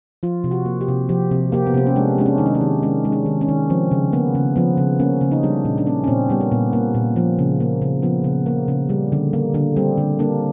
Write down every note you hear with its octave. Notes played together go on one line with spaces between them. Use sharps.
F3 F4
C3
F#4
A#3
G4
C3
F3 G4
C3
A#3 G4
B3
C3 C4
C#4
G#3 D4
G#3 D4
C#4
D#3 D#4
D4
C#4
D#3
G#3 C#4
G#3
D4
D#3
C#4
D#3
F3 C4
C#3
A#3 B3
C#3
F3 B3
C#3
A#3 C#4
C#3
D#4
G3 D4
A#2 C#4
D4
A#3 C#4
C#4
A#2 C4
G3 B3
A#3
A#2 B3
A#3
A#2
F3
C#3
A#3
C#3
F3 B3
C#3
A#3
C#3
G3
D3
A#3
D3
G3 C4
D3
A#3 D4